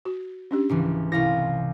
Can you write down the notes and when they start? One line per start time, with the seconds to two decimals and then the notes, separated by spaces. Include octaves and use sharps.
0.05 F#4
0.51 C#4 D4 G4
0.69 G#1 C#2 E3
1.12 C2 E4 F5 A#6